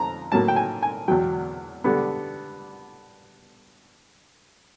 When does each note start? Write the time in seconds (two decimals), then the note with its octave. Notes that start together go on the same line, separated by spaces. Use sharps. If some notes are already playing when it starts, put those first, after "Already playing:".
Already playing: F2 A#5
0.32 A2 F#3 A#3 A5
0.48 G5
0.56 G#5
0.83 G#5
1.08 E2 B2 F#3 G5
1.84 D3 G3 B3